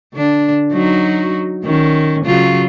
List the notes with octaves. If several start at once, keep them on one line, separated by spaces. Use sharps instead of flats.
D3 D4
F#3 D#4 F#4
D#3 C#4
C#3 F#3 F4